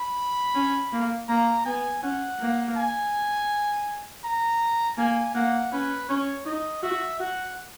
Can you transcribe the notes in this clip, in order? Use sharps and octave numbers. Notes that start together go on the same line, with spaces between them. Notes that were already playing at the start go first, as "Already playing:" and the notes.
Already playing: B5
C#4
A#3
A#3 A#5
B3 G#5
C#4 F#5
A#3
G#5
A#5
A#3 G#5
A#3 F#5
C#4 B4
C#4 C#5
D#4 D#5
F#4 E5
F#4 F#5